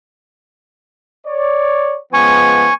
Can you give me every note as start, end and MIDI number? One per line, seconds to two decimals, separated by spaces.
1.27 1.98 73
1.27 1.98 74
2.14 2.70 53
2.14 2.70 56
2.14 2.70 59
2.14 2.74 80
2.14 2.74 85